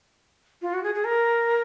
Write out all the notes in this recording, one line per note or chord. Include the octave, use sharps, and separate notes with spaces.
F4
F#4
G#4
G#4
A#4